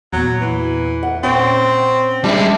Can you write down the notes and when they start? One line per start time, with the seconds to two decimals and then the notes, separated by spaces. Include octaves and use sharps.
0.13 E2 A#2 F#3
0.41 E3
1.03 F#5
1.23 A#2 C4 C#4 G5 C#6
2.24 G3 G#3 D4 G4 E5